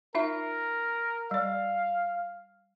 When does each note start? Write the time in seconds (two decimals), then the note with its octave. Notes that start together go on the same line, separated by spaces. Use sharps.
0.15 D#4 F4 A#4 E5
1.31 G3 D5 F5